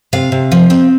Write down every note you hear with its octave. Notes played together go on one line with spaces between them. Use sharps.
C3 F5
C3
F3
C4